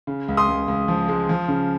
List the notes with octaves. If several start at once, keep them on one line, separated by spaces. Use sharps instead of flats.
C#3
C#2
C6 D#6
C#2
C#2
F3
G#3
F3
C#3